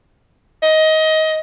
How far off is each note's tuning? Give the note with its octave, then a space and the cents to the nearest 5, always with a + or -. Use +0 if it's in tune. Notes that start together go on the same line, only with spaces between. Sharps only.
D#5 +20